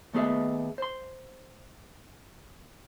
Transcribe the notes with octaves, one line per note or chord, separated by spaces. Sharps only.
D#2 A3 B3 G#4 D#5 E5
C5 C6